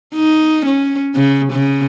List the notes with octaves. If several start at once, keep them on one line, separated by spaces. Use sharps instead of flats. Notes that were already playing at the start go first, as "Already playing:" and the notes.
D#4
C#4
C#3
C#3